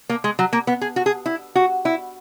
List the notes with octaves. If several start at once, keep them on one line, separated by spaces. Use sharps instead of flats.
A#3
G#3
F#3
A#3
B3
G#4
F#4
G#4
E4
F#4
E4